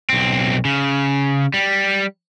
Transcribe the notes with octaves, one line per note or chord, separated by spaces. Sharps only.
B1 C4
C#3
G3